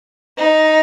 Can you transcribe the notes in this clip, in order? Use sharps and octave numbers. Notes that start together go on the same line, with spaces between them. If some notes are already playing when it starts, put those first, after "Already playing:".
D#4